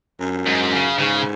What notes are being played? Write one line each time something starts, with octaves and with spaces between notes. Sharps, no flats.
F#2
G#2
C#3
G#2 C#3